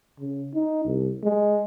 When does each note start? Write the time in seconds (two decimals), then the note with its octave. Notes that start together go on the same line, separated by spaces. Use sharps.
0.20 C#3
0.55 D#4
0.85 C2
1.23 G#3